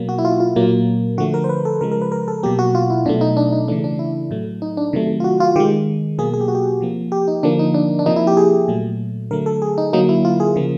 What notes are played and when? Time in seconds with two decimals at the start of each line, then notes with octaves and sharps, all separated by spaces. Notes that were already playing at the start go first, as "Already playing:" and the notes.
Already playing: B2 F#3 A#3
0.09 F#4
0.18 E4
0.25 F4
0.40 F4
0.56 A#2 F#3 A#3
1.18 D3 F3 A3 F#4
1.34 A#4
1.44 C5
1.49 B4
1.65 A4
1.81 C#3 F3 G#3 A#4
1.91 A#4
2.02 B4
2.12 A#4
2.28 A4
2.43 B2 F#3 A#3 G4
2.59 F#4
2.75 F4
2.90 E4
3.06 B2 F#3 A3 D4
3.21 D#4
3.37 D4
3.52 D#4
3.68 C#3 E3 A3 D4
3.84 D4
3.99 E4
4.31 A2 F#3 A3
4.62 D#4
4.77 D4
4.93 C3 D#3 F#3 A3
5.20 F4
5.24 F#4
5.40 F4
5.56 D#3 G4
5.60 G#3
6.18 B2 F#3 A#3 G#4
6.34 G#4
6.41 G4
6.48 F#4
6.55 G4
6.81 C3 F3 A#3
7.12 G4
7.28 D#4
7.43 D3 F3 A#3 D4
7.59 D#4
7.74 D4
7.99 D4
8.06 C3 F3 A#3 D#4
8.16 E4
8.27 G4
8.37 G#4
8.68 A#2 F#3 A3
9.31 D3 F#3 A3 A#4
9.46 A4
9.62 G#4
9.78 D#4
9.93 D3 F#3 A#3 D#4
10.09 E4
10.25 F4
10.40 G#4
10.56 C#3 F3 A#3